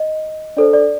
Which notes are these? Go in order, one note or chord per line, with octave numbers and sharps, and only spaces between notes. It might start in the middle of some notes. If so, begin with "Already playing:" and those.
Already playing: D#5
D4 A4 C5 D5
D5